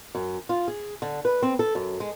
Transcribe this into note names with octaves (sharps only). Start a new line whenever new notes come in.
F#2
F4
G#4
D3
B4
C4
A4
F#2
G#3